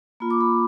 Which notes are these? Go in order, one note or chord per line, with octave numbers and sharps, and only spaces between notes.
A#3 F4 B5
D6
B5